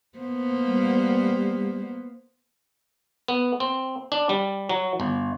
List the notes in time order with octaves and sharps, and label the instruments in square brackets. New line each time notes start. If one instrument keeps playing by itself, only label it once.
[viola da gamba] A#3 B3 C5
[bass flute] G3
[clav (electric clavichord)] B3
C4
D4
G3
F#3
G1